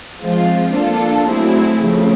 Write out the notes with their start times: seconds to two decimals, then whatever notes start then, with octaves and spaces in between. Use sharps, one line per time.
0.21 F3 G#3 C4 F4
0.74 A#3 D4 F4 A4
1.27 F#3 A3 C4 E4 G#4
1.80 C#3 F3 A3 C4